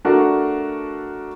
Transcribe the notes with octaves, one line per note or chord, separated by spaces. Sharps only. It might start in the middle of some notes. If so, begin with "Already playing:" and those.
A3 D4 F#4 A4 A#4